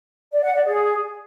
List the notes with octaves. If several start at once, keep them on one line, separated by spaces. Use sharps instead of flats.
D5
F#5
D5
G#4